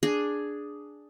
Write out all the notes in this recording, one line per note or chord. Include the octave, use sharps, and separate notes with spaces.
D4 G#4